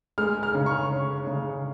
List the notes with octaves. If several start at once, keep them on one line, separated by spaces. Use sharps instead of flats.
G#3 F6
F6
C#3
C#6
C#4
C#3